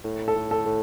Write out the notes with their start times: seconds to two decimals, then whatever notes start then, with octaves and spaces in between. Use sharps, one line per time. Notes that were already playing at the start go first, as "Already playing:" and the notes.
0.05 A2
0.28 A4
0.36 A2
0.51 A4
0.66 A2